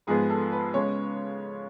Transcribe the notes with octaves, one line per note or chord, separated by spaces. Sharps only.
G#2 F3 G#3 B3 G#4
A4
B4
C#3 G#3 B3 C#5